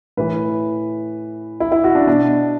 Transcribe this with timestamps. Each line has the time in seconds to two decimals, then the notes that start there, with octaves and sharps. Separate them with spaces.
0.17 A2 E3 B4
1.60 E4
1.72 E4
1.84 F#4
1.95 D4
2.07 B2 D4